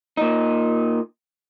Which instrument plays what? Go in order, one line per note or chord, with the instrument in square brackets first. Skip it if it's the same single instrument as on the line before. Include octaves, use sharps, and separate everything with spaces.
[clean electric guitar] A#2 D#4